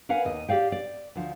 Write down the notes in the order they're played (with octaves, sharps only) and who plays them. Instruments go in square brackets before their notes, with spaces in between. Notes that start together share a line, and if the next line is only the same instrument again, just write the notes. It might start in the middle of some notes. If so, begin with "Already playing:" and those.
[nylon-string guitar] A#4 B4 F5 F#5 G#5
D#2 D#5
G4 G#4 D5 F5 G5
D5
D2 F3